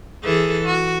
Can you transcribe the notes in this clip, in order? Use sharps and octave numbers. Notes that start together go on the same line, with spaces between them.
E3 G#4 A4
F#4